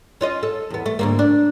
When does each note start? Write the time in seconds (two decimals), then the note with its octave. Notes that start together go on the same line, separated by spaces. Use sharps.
0.21 C#4 F4 D#5
0.43 A4
0.70 E2 B3
0.86 A3
0.99 D2 G#2 A#3
1.19 D4